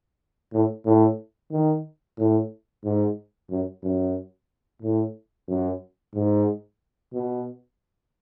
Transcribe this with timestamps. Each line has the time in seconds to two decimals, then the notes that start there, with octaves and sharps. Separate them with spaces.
0.53 A2
0.86 A2
1.52 D#3
2.18 A2
2.84 G#2
3.50 F#2
3.83 F#2
4.82 A2
5.48 F#2
6.15 G#2
7.13 B2